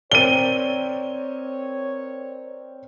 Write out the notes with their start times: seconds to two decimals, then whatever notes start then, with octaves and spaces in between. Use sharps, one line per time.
0.12 C4 A#4 C#5 D5 D#7 G7